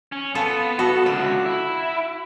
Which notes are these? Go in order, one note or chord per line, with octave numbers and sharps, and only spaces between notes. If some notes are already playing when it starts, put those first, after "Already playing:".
C#4
B3 F4 A4
F#4 A4
C#2 D3 E5
E4